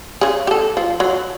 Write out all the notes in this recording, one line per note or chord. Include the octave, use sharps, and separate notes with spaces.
C#3 G#4
G4 A4
F3
F#3